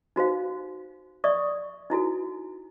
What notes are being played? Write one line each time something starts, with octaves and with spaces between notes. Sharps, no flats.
D#4 F#4 C5 F5
D5 E5 C#6 D#6
D#4 E4 F#4 A4